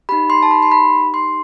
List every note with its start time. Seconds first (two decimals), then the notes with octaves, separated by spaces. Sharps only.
0.09 D#4 G4 B5
0.30 C6
0.43 A5
0.51 B5
0.62 C6
0.72 B5
1.14 C6